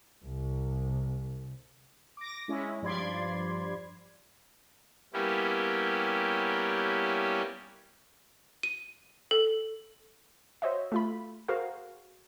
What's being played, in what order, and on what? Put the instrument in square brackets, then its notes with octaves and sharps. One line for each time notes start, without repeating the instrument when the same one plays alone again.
[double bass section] C2
[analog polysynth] D6 A#6
G#3 C#4 E4
G2 F3 D5 B5 C6 G#6
[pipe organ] G3 A#3 B3 C#4 E4 G4
[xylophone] D#7
A4
[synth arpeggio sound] F#4 C5 C#5 D#5 E5
A3 F4 B5
F#4 G#4 A#4 C5 F5